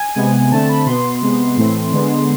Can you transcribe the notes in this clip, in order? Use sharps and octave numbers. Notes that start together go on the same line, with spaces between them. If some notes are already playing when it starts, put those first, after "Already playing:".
Already playing: G#5
C3 G#3 B3
D3 A3 C4 A5
B5
B2 B3 C6
C3 G#3 B3
A2 E3 A3 C4
D3 G#3 B3